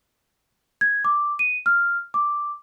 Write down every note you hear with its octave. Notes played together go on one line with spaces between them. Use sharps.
G#6
D6
D#7
F6
D6